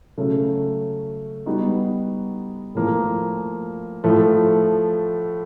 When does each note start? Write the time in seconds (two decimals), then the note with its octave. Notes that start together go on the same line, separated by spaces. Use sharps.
0.18 C#3 F#3 A3
1.46 G3 B3 D#4 F#4
2.75 A2 F3 A#3
4.04 A2 F3 A3